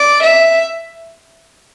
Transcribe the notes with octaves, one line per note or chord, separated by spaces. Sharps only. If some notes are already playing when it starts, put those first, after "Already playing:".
Already playing: D5
E5